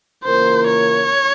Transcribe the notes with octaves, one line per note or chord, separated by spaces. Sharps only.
C#3 E3 A#3 F4 A#4 C5
C#5